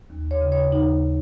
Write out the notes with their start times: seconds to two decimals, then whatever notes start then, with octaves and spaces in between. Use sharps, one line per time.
0.10 D#2
0.31 C#5
0.41 C#3
0.52 C#5
0.72 D#2 D#4
1.04 C#3